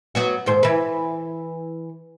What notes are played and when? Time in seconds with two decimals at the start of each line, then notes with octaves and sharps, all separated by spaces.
0.15 F#3 B3 F#4
0.46 D#2 G#2 C5
0.63 E3 B4